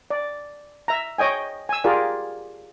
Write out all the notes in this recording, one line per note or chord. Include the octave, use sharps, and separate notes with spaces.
D5
E5 A#5
C#5 D#5 G5 G#5
G#5 E6
F4 G4 G#4 A#4 D5